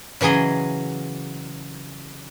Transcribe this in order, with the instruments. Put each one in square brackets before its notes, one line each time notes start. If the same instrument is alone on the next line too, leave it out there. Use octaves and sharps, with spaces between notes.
[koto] C#3 E3 F#3 G#4 D#5